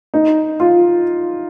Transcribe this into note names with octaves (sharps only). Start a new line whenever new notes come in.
D#4
F4